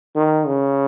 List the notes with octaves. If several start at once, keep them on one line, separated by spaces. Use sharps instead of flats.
D#3
C#3